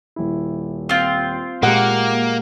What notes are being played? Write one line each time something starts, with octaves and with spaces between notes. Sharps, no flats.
D#1 E4
C4 F4
A#2 G#3 A#3 G4 A#4 F#5